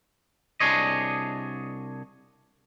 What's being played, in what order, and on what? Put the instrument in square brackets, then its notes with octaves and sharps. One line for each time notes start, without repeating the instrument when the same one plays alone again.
[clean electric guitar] C2 D4 G#4 C#5 D#5